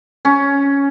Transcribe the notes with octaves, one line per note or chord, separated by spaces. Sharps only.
C#4